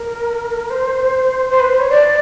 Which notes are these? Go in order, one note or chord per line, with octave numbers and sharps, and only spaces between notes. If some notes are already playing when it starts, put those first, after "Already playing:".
Already playing: A#4
C5
C5
B4
C5
C#5
D5